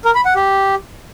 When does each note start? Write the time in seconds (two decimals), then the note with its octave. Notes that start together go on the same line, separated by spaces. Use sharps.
0.05 A#4
0.15 B5
0.25 F#5
0.35 G4